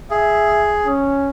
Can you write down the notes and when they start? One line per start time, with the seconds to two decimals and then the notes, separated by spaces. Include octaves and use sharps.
0.10 G#4 E5
0.85 C#4